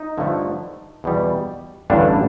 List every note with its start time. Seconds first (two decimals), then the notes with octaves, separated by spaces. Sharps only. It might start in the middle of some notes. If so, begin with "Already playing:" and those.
Already playing: D#4
0.18 G2 D3 F3 A3
1.04 E2 B2 G3
1.90 A1 G2 D3 G3 D4